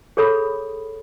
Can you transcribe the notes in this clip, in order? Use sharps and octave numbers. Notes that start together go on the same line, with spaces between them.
G#4 A4 C#5 B5 D#6